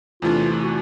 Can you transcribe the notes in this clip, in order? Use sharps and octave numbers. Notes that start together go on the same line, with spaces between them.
E2 C3 E3 A3 D4 F4
F#4